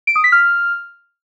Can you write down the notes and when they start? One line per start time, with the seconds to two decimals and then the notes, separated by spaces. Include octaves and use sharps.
0.07 D7
0.16 D#6
0.24 B6
0.32 F6